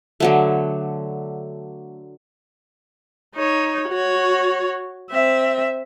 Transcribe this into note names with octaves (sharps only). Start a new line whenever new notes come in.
D3 F#3 A3
D#4 C#5
F#4 C#5
C4 E5